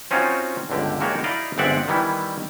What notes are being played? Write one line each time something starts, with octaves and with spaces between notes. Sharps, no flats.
C4 C#4 D#4 F4 F#4
G1 C#2 D3 G4
G#3 A#3 F#4 G4 C#5 D5
D#4 E4 D5 D#5 F5
G1 G#3 C4 D5 E5 F#5
D#3 E3 G3 B3 E4